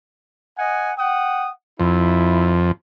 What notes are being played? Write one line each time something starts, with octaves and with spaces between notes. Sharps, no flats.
D#5 F#5 G#5
F#5 G5 D#6
F2 E4